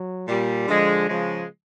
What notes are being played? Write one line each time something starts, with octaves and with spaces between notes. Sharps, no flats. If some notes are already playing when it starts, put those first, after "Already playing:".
Already playing: F#3
A#2 G3
D3 F3 G#3
C#3 F3 G#3